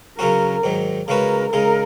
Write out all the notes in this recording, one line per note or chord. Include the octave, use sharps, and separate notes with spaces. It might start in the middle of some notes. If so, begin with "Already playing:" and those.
C#3 F#3 C#4 F#4 A#4
G#2 D#3 F#3
C#3 G#3 C#4 F#4 A#4 B4
C#3 G#3 D#4 A#4